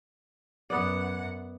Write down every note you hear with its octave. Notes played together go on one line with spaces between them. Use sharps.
F#2 B3 D5 F#5